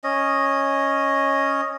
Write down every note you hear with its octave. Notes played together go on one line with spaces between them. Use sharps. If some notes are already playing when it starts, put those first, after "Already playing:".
C#4 D#5